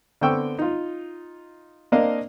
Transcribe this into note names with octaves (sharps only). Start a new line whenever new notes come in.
D3 B3 C4 G5 C#6 E6
D#4 F4
A#3 C4 D4 A#4 D#5 F5